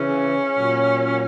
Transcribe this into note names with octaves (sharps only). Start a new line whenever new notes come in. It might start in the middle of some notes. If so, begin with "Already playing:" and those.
Already playing: C#3 E3 C#4
A#2 F#3